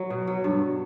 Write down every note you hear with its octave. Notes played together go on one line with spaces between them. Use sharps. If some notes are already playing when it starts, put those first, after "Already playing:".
Already playing: F#3
B2
F#3
G2